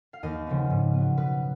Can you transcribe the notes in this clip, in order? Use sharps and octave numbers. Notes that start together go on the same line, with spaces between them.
F5
D#2 D#5
C#3 F3 B3
G#2
F#3 B3
B2 B4